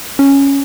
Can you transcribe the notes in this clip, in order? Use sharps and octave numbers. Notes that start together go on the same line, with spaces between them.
C#4